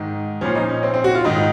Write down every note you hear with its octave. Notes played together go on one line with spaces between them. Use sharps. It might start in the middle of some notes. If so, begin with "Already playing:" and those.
Already playing: G#2 D#3
A#2 F3 C#4
D#4
C#4
C4
C4
F#4
F4
G#2 D#3 D#4